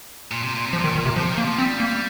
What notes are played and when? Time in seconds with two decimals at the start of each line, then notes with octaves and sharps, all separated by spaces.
0.31 A#2
0.43 C3
0.55 A#2
0.66 C3
0.73 F3
0.78 A#2
0.84 D#3
0.95 D#3
1.06 C3
1.16 C3 F3
1.31 D#3
1.38 A#3
1.44 F3
1.58 G3 C4
1.80 A#3